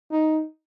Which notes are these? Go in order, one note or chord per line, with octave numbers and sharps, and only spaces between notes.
D#4